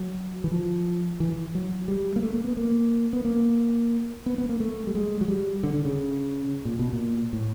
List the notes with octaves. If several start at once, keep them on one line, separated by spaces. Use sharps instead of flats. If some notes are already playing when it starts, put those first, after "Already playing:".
Already playing: F#3
E3
F3
E3
F#3
G3
A#3
A3
A#3
B3
A#3
B3
A#3
B3
B3
A#3
A3
G3
G#3
F#3
G3
D3
D3
C#3
A#2
B2
A#2
A2